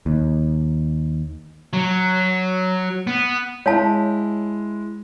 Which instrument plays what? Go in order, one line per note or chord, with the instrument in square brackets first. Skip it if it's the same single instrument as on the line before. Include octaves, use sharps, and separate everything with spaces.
[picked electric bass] D#2
[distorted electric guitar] F#3
B3
[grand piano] G#3 E4 [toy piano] C#5 F5 A5